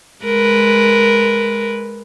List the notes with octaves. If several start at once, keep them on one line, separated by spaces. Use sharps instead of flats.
G#3 A#4 B4